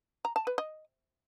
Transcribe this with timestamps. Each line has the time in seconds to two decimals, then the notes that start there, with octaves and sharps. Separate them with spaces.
0.25 A#5
0.36 A5
0.47 B4
0.58 D#5